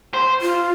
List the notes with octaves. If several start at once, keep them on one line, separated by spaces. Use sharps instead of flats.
C5
F4